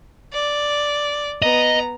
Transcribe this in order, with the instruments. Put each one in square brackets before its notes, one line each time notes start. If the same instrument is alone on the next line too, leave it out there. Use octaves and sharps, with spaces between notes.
[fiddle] D5
[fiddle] B3 A#5 [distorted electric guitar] D#5